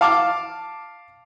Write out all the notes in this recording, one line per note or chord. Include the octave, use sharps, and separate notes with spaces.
F5 A5 D6 F6